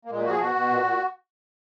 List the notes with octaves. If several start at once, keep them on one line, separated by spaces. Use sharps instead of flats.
A#3
A#2 G#3
A#3
F3 F#4 G#4
B2 F#4
B2
A#2
A#2